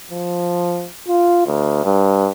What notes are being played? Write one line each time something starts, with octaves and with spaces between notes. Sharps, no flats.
F3
F4
D2
G2